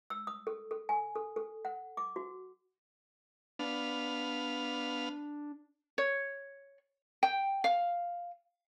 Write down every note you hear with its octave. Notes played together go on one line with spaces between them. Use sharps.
E6
D#6
A4
A4
G#5
A4
A4
F#5
D6
F#4
B3 D4 F5
C#5
G5
F5